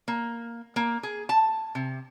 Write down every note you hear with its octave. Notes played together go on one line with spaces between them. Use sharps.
A#3
A#3
G#4
A5
C3